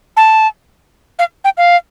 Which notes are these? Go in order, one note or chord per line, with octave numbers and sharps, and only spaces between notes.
A5
F5
G5
F5